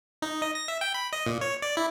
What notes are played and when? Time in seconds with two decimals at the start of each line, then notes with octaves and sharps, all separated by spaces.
0.22 D#4
0.42 D#5
0.55 A#6
0.68 E5
0.81 G5
0.94 B5
1.13 D#5
1.26 A#2
1.41 C#5
1.62 D5
1.77 E4